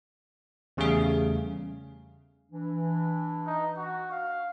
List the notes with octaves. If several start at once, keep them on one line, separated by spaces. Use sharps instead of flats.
E2 C#3 G3 A3 G#4 F5
E3 D4
D#4
F#4
F5